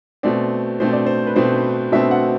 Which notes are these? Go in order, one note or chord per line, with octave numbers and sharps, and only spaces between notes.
B2 A3 C4 D5
B2 A3 C4 C5
D5
C5
B4
B2 A3 C4 C5
B2 A3 C4 E5
F#5